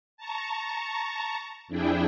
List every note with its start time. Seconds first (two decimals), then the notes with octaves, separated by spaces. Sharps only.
0.17 A5 A#5 C#6
1.68 F2 D4 E4 G#4 G5